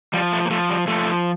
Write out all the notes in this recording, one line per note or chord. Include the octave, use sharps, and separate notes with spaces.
F3 G3
A3
A#3
F3 A3
G3
F3 A3